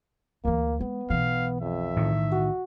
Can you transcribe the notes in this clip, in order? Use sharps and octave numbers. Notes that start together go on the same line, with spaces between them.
D2 E3 A#3
G#3 B3
B1 E3 F5
F2 E5
A2 D#3
F#4